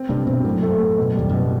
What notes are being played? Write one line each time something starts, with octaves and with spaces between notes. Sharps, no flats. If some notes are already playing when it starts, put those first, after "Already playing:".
Already playing: C4
G2 C3
B2 C4
F#2 A2
A3
F#2
B2
E2 G3
F#2 B2